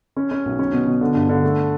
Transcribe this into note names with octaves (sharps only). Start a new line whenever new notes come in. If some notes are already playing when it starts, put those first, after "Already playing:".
C#4
C#4
B1
C#4
B2
B2
D3
G2
D3
A3